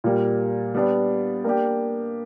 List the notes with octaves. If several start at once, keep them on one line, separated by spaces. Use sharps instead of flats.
A#2 G3 A#3
G3 B3 D4
A#3 D4 G4